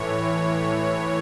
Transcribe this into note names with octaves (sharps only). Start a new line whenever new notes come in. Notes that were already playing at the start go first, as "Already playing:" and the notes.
Already playing: A2 E3 C#5